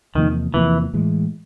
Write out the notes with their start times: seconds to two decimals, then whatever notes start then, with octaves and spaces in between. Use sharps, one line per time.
0.15 E2 C3 D#3 F3 A#3
0.54 E2 C3 E3 F3 A#3
0.93 A2 E3 G#3